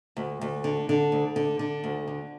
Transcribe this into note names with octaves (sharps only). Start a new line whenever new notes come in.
D2
D2
D3
D3
D2
D3
D3
D2
D3